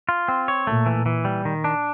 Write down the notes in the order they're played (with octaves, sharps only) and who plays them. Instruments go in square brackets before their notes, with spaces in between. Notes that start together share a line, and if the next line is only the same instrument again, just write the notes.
[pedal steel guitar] F4
C4
C#5
[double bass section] A#2 [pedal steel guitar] A3
[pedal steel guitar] E3
E3
G3
D#3
D4